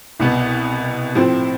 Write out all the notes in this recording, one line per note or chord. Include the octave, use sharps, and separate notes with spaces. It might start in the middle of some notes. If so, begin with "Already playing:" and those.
C2 B2 B3
A2 F3 C4